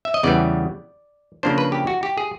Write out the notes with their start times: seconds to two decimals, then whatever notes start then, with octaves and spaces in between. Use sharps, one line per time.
0.05 E5
0.14 D#5
0.23 E2 C#3 E3 G3 B3 D5
1.43 C#3 F3 A#3 D4 C5
1.58 B4
1.72 G4
1.87 F#4
2.03 G4
2.18 G#4